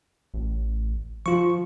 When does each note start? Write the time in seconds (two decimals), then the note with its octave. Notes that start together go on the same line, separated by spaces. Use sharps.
0.34 A1
1.26 F3 F4 C#6